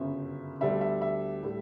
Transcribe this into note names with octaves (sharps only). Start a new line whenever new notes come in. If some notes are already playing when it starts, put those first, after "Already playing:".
Already playing: G1 F#2 C#3 E5
D2 D3 G3 B3 D4 E5
E5
E5
A2 G3